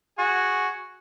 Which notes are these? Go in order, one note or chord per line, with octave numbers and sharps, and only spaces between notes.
F#4 G#4